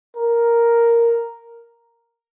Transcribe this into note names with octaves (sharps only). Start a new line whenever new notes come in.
A#4